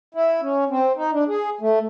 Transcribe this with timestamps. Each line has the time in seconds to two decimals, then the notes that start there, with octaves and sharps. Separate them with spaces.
0.15 E4
0.42 C#4
0.70 C4
0.96 D#4
1.13 D4
1.28 G#4
1.61 A3